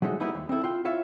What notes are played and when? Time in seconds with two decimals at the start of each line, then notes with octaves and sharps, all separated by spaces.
0.02 F#3 G#3 A3 D#4 F#4
0.20 F#3 G3 A#3 B3 D#4 E4
0.35 D#2
0.49 C4 D#4 E4 A4
0.64 F4 G5
0.85 E4 F4 C#5 E5 F5